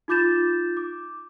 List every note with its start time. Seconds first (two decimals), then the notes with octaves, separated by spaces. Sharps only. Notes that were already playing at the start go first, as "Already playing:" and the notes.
0.08 D#4 F4 D6 G6 A6 E7
0.77 D6